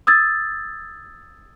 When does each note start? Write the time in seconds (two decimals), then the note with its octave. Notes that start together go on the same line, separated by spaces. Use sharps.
0.07 D#6 E6 G#6 A6